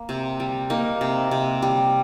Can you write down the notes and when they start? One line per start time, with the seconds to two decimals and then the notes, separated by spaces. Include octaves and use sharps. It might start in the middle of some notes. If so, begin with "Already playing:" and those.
Already playing: A#3
0.09 C3
0.40 G3
0.70 A#3 D#4
1.01 C3
1.31 C3
1.62 G3